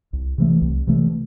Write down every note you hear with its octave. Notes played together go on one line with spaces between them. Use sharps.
C2
C3 E3 A3
C2
C3 E3 A3